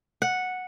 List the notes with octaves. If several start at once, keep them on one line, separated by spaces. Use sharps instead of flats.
F#5